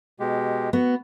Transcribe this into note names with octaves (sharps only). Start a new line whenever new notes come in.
B2 G#3 G4
B3 F#4